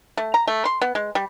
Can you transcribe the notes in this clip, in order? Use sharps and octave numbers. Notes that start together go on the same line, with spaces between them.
A3
A#5
A3
C6
B3
G#3
G3